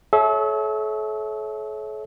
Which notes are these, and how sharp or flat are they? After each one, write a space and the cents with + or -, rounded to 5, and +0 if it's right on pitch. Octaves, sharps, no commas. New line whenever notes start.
A4 -40 C#5 +0 E5 -15